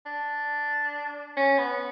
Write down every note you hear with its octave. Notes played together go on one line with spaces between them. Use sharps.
D4
C#4
B3